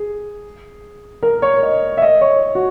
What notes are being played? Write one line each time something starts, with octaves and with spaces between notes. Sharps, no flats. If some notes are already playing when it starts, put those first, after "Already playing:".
Already playing: G#4
A#4
C#5
D#5
E5
D#5
C#5
F#4